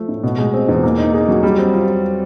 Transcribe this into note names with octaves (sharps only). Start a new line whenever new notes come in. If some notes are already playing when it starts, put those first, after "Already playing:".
Already playing: F3 A3
A2
B2
G#3
C4
E2
A#3
D#4
G#4
F#3
G3
C4
F4